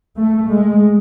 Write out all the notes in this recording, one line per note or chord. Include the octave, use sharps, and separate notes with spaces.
A3
G#3